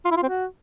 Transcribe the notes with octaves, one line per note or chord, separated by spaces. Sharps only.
F4
E4
F4
C4
F#4